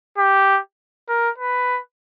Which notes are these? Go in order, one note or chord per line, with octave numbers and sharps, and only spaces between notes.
G4
A#4
B4